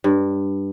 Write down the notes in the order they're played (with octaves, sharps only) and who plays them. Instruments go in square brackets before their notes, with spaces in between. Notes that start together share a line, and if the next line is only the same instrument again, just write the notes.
[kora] G2